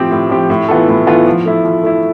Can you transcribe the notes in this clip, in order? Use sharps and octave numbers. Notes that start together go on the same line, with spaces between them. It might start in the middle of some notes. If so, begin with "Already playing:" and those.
Already playing: A2 F3 C4 G4
A2
F3 C4 G4
A2
E3 B3 F4 A4
A2
E3 B3 F4 A4
F3
A3 E4
F3
A3 E4